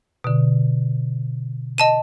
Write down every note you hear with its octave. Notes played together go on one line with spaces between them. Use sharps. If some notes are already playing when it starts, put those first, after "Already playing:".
B2 D3
D#5 A5 D#7